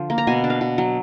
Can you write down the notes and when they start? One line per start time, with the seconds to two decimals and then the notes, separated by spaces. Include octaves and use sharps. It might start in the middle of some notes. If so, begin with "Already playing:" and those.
Already playing: D3 F3
0.10 A#3
0.18 A#5
0.27 B2 G#5
0.44 D4
0.50 F5
0.61 B2
0.78 F#3